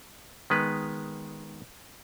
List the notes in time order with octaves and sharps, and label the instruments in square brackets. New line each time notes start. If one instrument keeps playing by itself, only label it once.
[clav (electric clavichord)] D#3 G#3 B3 B4